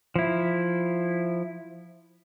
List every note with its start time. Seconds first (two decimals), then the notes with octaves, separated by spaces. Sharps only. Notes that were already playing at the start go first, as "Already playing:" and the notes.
0.16 F3 E4